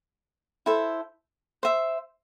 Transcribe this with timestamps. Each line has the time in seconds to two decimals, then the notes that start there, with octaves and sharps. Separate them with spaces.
0.66 E4 A4 C5
1.63 C5 E5